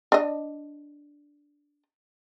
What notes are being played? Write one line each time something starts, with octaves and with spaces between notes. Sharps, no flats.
D4 D#5